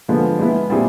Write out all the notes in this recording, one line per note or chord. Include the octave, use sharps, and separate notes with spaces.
D3 F3 G#3 B3
G#3 B3 E4
A#2 G3 C4 E4 G#4